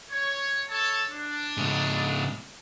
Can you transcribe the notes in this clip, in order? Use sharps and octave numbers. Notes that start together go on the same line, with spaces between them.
C#5
A4 C#5 A5
D4
G#2 C#3